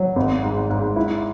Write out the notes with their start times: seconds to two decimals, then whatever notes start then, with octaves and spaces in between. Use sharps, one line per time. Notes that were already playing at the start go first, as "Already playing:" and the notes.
Already playing: F#3
0.16 G#1
0.44 G#2
0.70 G#2
0.96 E4